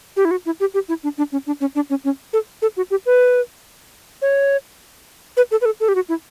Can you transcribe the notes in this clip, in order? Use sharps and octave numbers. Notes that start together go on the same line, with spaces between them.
G4
E4
F#4
E4
G4
G4
E4
D4
D4
C#4
D4
C#4
D4
C#4
C#4
A4
A4
F#4
G4
B4
C#5
B4
A4
B4
A4
A4
G4
F#4
E4